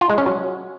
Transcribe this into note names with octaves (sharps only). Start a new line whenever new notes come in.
F4
G#3
C#4
F#3